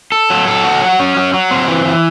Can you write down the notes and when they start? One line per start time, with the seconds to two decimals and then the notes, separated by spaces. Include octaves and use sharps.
0.12 A4
0.30 F#3
0.48 A4
0.64 F#4
0.81 F#3
0.99 C#4
1.17 F#3
1.34 F#3
1.51 C4
1.68 E3
1.85 E3